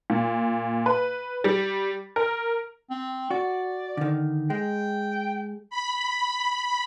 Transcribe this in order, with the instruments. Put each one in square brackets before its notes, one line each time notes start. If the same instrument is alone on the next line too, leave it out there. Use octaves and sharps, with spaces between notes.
[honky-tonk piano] A#2
B4
G3
A#4
[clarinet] C4
[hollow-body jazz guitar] F#4 [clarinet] D5
[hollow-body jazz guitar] D3 D#3
[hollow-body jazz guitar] G#3 [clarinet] G5
[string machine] B5